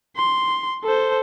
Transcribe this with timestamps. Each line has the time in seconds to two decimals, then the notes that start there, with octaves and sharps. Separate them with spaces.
0.16 C6
0.84 A4 C5